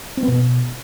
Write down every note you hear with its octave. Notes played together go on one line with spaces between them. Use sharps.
C4
B3
B2